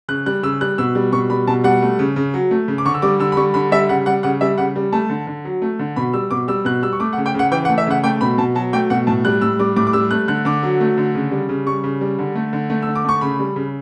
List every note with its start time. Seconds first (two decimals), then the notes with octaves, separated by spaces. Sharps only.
0.08 C#3 F#6
0.26 G3 F#6
0.43 C#3 E6
0.61 G3 F#6
0.78 B2 E6
0.95 G3
1.12 B2 C#6
1.30 G3 B5
1.47 B2 A5
1.64 G3 F#5
1.82 A3
1.99 C#3
2.16 C#3
2.34 F#3
2.51 A3
2.68 C#3
2.78 D6
2.85 D3 C#6
2.94 E6
3.02 G3 D6
3.19 D3 E6
3.32 B5
3.37 G3 C#6
3.54 D3 B5
3.72 G3 E5
3.89 C#3 F#5
4.06 G3 F#5
4.23 C#3 F#5
4.41 G3 E5
4.58 C#3 F#5
4.76 G3
4.92 A3 A5
5.10 D3
5.27 D3
5.45 F#3
5.62 A3
5.79 D3
5.96 B2 B5
6.13 G3 E6
6.31 B2 D6
6.48 G3 E6
6.65 B2 F#6
6.82 G3 E6
6.93 C#6
7.00 A3 D6
7.13 F#5
7.17 C#3
7.26 G5
7.34 C#3 F#5
7.52 E3 G5
7.65 F#5
7.69 A3
7.78 E5
7.87 C#3 F#5
8.04 A3 G5
8.21 B2 B5
8.38 B2 A5
8.55 F#3 A5
8.73 A3 G5
8.90 B2 F#5
9.07 A2 A5
9.25 G3 F#6
9.41 A2 E6
9.59 G3 D6
9.76 A2 D6
9.87 D6
9.93 G3 E6
10.11 A3 F#6
10.28 D3 F#6
10.45 D3 D6
10.63 F#3
10.80 A3
10.98 D3
11.15 C#3
11.32 G3
11.49 C#3
11.66 G3 C#6
11.84 C#3
12.01 G3
12.19 D3
12.35 A3
12.53 D3
12.70 A3
12.82 D3 E6
12.95 D6
13.04 A3 C#6
13.21 C#3 B5
13.39 G3
13.56 C#3